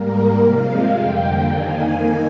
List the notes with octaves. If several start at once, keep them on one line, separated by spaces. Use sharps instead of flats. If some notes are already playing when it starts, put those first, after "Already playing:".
Already playing: G#2 G3 A#3 A#4
C3 F3 G#3 F5
F2 D3 G3 A#3 G5
F2 D#3 A#3 G#5